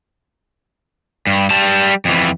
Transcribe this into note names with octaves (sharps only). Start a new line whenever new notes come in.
G2
G3 A5
F2 E3